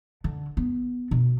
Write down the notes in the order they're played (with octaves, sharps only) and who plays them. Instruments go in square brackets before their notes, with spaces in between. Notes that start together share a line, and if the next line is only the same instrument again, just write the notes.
[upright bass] D3
B3
B2